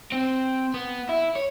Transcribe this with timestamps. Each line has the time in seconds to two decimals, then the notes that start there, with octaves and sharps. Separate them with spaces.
0.12 C4
0.74 B3
1.09 E4
1.36 C#5